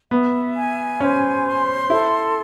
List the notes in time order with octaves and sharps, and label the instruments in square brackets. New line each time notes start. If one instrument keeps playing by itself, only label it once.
[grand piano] B3 [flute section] E5
[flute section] G#5
[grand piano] C#4 [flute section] C5
[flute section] C6
[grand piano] E4 [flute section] A4